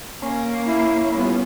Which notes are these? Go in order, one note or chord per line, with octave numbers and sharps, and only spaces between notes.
A#3 C#4
E4
G3 B3 F4